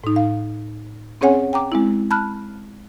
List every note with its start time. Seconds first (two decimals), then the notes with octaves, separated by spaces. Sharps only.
0.04 A2 D#4
0.16 F5
1.21 C4 C#4 G#4 C#5 F#5 G#5
1.53 G5 A#5 D6
1.72 G#3 C4 E4
2.11 A5 B5 F6 F#6